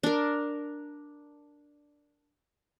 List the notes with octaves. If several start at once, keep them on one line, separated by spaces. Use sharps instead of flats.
D4 A#4